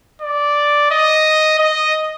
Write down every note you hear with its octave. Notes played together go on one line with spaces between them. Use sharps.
D5
D#5
D#5